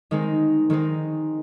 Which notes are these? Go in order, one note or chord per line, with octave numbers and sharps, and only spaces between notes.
D#3 G#3 C4 D#4
D#3 G#3 C4 D#4